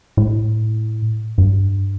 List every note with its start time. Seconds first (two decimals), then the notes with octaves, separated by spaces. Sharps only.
0.17 A2
1.38 G2